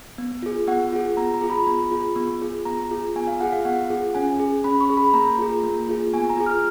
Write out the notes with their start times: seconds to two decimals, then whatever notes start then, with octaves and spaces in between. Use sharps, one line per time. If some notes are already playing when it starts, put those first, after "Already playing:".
0.18 B3
0.42 F4 G#4
0.68 B3 F#5
0.92 F4 G#4
1.17 B3 A#5
1.34 A#5
1.41 F4 G#4
1.50 B5
1.67 B3
1.91 F4 G#4
2.16 B3
2.42 F4 G#4
2.65 B3 A#5
2.91 F4 G#4
3.15 B3 G#5
3.27 F5
3.40 F4 G#4 F#5
3.52 F5
3.65 B3 F#5
3.90 F4 G#4
4.15 C#4 G#5
4.40 G#4
4.64 C#4 B5
4.81 C#6
4.90 G#4
4.97 B5
5.13 A#3 A#5
5.38 F4 G#4
5.63 A#3
5.89 F4 G#4
6.13 B3 G#5
6.30 A#5
6.38 F4 G#4
6.46 F6